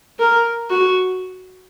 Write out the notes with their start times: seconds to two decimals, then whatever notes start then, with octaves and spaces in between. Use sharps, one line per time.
0.19 A#4
0.70 F#4